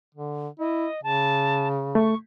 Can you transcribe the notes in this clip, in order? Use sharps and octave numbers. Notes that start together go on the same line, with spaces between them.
D3
E4 D#5
C#3 A5
A3 C#6